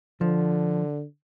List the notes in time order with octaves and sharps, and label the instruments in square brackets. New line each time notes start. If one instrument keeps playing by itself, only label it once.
[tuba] D3 [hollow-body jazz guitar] F3